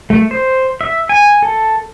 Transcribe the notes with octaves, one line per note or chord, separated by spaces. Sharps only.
A3
C5
E5
G#5
A4